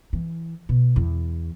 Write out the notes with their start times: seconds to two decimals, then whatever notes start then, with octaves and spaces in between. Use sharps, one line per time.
0.13 E3
0.69 B2
0.96 E2